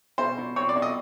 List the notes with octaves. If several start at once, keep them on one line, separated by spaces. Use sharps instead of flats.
B2 C5
B2
C4 C#5
D5
B2
D#5